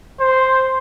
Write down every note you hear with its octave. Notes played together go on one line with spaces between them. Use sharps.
C5